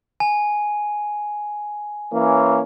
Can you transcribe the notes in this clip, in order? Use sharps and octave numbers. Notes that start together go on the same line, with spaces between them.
G#5
E3 A#3 C#4